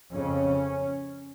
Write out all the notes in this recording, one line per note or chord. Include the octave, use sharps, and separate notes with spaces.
F2 C#3 C#4